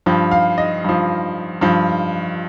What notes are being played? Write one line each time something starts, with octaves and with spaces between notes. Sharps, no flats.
G2 F3
F5
D#5
G2 F3
G2 F3